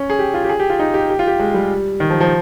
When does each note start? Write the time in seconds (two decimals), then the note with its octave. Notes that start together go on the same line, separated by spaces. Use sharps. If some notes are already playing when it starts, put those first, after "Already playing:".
Already playing: C#4
0.10 G#4
0.19 G4
0.34 F4
0.44 G4
0.49 G#4
0.60 G4
0.70 F4
0.79 D#4
0.94 G4
1.10 G4
1.19 F4
1.27 G4
1.39 G#3
1.54 G3
2.00 D#3
2.10 F3
2.20 F3